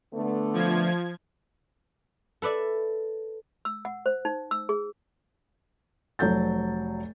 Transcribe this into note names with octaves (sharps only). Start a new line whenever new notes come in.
D3 A3 B3
F3 G#6
A4 B4 D5 E5
E6
F#5
C5
D#4
E6
G#4
F1 F#3 A4 G6 A6